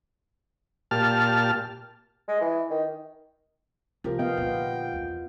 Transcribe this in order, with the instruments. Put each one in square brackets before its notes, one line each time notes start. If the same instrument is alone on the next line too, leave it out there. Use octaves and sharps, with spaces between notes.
[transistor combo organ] A#2 G4 A5 F6
[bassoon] G#3
E3
D#3
[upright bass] C3 [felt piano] F3 G4 A#4
[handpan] B3 D#5 F5 [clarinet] G5
[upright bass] A#2 D3 [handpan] B3 F4
[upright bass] E2 C4